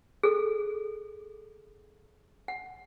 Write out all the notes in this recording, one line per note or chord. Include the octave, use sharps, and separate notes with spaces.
G#4 A4
F#5